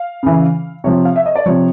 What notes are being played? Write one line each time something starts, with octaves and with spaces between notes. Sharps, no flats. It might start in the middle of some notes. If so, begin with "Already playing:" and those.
Already playing: F5
C#3 E3
C3 F3 C#5
F5
E5
D#5
D5
C3 F3 C#5